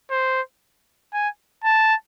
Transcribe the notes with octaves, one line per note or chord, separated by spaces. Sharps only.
C5
G#5
A5